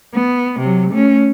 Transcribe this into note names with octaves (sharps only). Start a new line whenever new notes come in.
B3
C3 F#3
A3 C#4